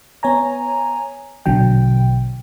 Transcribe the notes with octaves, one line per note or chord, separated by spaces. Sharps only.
B3 C#5 G#5 A#5
A#1 B2 D3 F#3 G5